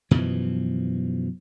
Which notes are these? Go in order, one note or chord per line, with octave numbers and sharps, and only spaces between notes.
F#2 B2 E3 F3